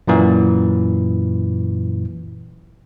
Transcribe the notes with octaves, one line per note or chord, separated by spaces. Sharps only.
F#2 A#2 E3